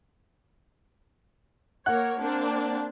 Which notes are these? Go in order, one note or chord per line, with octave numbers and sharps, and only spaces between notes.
A#3 A#4 C#5 F#5 F#6
A#3 C4 D4